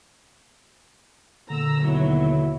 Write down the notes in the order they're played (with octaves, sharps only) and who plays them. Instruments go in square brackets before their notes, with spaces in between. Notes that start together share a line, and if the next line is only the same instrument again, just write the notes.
[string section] A#2 A#5 E6 [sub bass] D3
[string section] D#2 B2 F#3 [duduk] E4